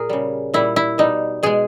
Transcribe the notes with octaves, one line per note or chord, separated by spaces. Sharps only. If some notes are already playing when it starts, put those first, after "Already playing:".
Already playing: A#2 G#4 A#4
C#3 G3
A#2 G3 E4
E4
B2 G3 D#4
B2 G#3 G#4